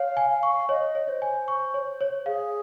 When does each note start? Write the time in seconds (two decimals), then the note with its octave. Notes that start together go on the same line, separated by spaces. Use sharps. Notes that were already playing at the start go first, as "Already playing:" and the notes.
Already playing: C#5 F5
0.17 G#5
0.30 F5
0.43 C#6
0.69 C#5 D#5
0.95 C#5
1.09 C5
1.22 G#5
1.48 C#6
1.74 C#5
2.01 C#5
2.26 G#4 F5